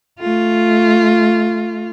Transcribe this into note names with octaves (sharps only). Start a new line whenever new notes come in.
A3 F4